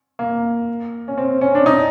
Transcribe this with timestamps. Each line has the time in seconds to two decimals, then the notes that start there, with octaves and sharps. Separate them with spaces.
0.19 A#3
1.08 C#4
1.18 C4
1.41 C#4
1.55 D4
1.66 D#4